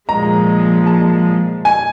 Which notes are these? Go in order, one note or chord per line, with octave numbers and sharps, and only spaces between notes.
A#2 F3 G#3 A#5
A5
G#5